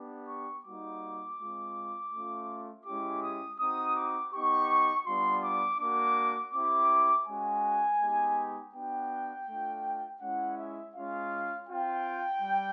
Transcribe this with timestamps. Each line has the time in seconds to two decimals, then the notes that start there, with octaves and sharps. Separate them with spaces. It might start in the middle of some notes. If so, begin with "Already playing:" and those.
Already playing: B3 D4 G4
0.28 C#6
0.65 G3 A#3 D#4 F#4 D6
1.40 G#3 C4 F4
2.12 A3 C#4 F4
2.86 G#3 C#4 E4 G4 D6
3.23 D#6
3.60 C4 D#4 F#4 D#6
3.97 D6
4.33 B3 D#4 G4 C#6
5.07 G3 B3 D4 F4 C6
5.44 D6
5.80 A#3 D4 F#4 D6
6.54 C4 E4 G4 D6
7.27 G#3 C#4 F#4 G#5
8.01 G#3 B3 D#4 G4
8.74 B3 D4 F#4 G5
9.48 A3 D4 F4
10.22 G#3 C#4 E4 F#5
10.58 E5
10.96 G#3 C#4 F4 F5
11.69 C4 F4 G5
12.42 G3